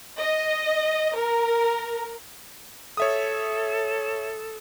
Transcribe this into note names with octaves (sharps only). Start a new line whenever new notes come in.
D#5
A#4
A4 C#5 E5 D#6